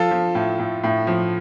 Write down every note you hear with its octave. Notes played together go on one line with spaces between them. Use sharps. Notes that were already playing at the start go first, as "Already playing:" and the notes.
Already playing: F3 F4 A4
F3
A2
A2
A2
F3